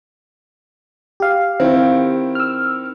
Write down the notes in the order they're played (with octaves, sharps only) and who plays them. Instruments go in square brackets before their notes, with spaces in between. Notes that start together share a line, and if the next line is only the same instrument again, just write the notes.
[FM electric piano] G4 F5
[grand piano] D#3 C4 E4
[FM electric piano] E6 F6